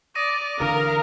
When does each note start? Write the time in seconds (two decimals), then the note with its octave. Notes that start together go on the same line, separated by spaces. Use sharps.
0.15 D5 D#6 A#6 D#7
0.60 D3 E3 A#4 F5